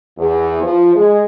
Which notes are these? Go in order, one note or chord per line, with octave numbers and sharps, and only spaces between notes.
E2
F3
G#3